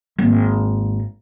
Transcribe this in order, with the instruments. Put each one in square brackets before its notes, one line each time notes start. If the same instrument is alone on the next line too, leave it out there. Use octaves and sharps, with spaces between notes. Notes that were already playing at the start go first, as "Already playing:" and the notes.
[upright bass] G#1 A#3